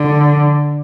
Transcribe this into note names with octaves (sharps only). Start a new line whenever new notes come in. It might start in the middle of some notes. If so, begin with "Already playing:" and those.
Already playing: D3